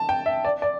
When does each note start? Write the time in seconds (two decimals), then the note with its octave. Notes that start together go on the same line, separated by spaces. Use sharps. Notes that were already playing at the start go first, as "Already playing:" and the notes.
Already playing: A5
0.09 G5
0.26 E5
0.45 D5
0.62 D5